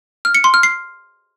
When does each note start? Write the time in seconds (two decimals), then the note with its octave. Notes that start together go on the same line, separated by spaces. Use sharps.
0.25 F6
0.35 C#7
0.44 C6
0.54 F6
0.63 C7